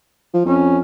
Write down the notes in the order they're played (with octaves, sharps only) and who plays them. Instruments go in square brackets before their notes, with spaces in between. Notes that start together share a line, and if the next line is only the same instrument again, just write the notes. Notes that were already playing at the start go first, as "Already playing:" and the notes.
[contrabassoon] F3
[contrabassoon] F2 [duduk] C#4